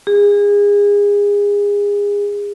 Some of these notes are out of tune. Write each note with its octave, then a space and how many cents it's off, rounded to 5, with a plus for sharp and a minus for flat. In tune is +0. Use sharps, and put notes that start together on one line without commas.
G#4 -30